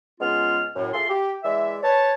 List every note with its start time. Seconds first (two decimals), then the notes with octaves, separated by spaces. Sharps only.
0.20 C#3 G#3 B3 C#4 F4 F6
0.75 F#2 A2
0.93 A3 F4 G#4 A4 C6
1.09 G4
1.44 E3 G#3 D5 E5
1.83 B4 C#5 A5